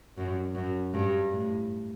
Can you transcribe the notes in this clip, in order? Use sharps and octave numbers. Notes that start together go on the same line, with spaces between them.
F#2
F#2
G2
A2